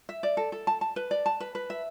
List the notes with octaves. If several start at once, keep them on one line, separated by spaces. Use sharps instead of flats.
E5
D5
A4
A4
A5
A5
B4
D5
A5
B4
B4
E5